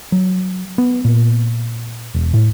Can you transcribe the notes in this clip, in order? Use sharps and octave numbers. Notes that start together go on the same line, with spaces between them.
F#3
B3
A#2
E1
A2